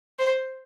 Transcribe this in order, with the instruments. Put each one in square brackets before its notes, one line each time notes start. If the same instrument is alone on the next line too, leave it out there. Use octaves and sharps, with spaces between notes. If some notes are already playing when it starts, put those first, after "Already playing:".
[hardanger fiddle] C5